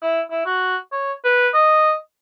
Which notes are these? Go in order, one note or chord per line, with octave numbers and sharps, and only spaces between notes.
E4
E4
F#4
C#5
B4
D#5